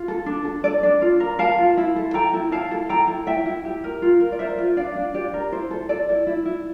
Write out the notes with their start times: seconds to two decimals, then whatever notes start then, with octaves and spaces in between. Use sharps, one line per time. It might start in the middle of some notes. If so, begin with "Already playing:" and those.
Already playing: F4
0.08 A4
0.26 D4
0.45 A4
0.64 A4 D5
0.83 D4
1.01 F4
1.20 A#4
1.39 A#4 F5 A5
1.58 F4
1.77 E4
1.96 A4
2.14 A4 G5 A#5
2.34 E4
2.51 E4 F5 A5
2.71 A4
2.89 A4 G5 A#5
3.08 E4
3.27 E4 E5 G5
3.46 E4
3.65 G4
3.84 A#4
4.02 F4
4.20 A#4
4.32 D5
4.39 A#4 C5 E5
4.59 F4
4.77 D4 D5 F5
4.96 D4
5.14 G4 D5
5.34 A#4
5.52 E4 C5
5.71 A4
5.89 A4 D5
6.09 E4
6.27 E4
6.45 E4